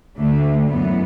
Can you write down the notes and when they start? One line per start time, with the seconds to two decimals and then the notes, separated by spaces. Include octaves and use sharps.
0.17 D2 D3 A3
0.68 F#2 E3 B3